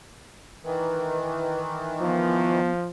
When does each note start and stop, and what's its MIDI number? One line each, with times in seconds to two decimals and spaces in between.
0.64 2.60 51
0.64 2.60 52
0.64 1.60 71
2.01 2.90 53
2.01 2.71 59